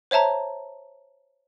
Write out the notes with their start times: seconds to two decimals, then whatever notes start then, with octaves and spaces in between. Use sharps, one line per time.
0.11 C5 C#5 E5 A5 A#5